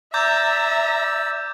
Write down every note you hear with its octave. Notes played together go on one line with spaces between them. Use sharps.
D5 E5 A#5 D6 E6 G6